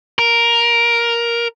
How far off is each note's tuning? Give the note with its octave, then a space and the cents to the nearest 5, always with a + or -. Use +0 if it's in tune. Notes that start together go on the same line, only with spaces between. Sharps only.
A#4 +10